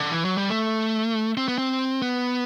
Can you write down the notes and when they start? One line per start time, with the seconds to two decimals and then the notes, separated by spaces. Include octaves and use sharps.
0.00 D3
0.12 E3
0.25 F#3
0.37 G3
0.50 A3
1.37 C4
1.48 B3
1.58 C4
2.02 B3